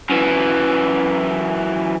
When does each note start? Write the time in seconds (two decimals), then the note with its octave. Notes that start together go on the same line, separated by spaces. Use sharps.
0.10 F#2 E3